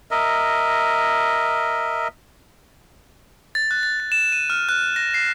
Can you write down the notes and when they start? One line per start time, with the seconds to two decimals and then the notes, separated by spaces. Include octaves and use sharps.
0.11 A#4 D#5 E5
3.55 A6
3.71 F#6
3.83 A6
4.00 A6
4.12 E7
4.32 D#7
4.50 F6
4.69 F#6
4.96 A#6
5.14 C7